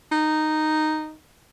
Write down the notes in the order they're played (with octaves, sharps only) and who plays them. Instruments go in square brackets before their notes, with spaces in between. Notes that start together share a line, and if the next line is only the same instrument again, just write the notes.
[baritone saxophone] D#4